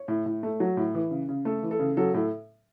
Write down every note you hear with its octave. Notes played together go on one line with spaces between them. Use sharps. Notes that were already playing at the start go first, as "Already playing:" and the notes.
Already playing: C#5
A2
A2
A3
F#3
A2
E3
C#3
C#3
A3 A4
E3
A4
C#3
F#3 A4
A2 A4